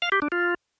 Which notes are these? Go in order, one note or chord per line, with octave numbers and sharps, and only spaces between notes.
F5
G4
D4
F4